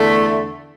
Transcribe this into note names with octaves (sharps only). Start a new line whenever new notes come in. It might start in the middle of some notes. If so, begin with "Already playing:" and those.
Already playing: E2 D3 A3